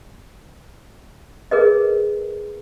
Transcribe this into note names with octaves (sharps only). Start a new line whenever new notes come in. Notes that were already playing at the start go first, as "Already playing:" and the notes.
G#4 A#4 B4 D#5